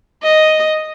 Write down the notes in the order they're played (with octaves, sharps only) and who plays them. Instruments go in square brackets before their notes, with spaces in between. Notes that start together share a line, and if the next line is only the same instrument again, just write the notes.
[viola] D#5